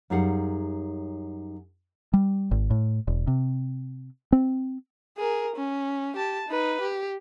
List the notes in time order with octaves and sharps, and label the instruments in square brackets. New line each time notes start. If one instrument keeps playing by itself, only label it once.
[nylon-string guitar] F#2 G3 D#4 G#4 F5 F#5
[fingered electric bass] G3
G#1
A2
E1
C3
C4
[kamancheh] G#4 A#4
C#4
G4 A5
D#4 B4
G4